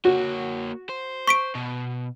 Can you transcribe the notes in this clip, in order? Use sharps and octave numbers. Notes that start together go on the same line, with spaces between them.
A#3 F#4 C#5
C5
C#6 B6 D7
B2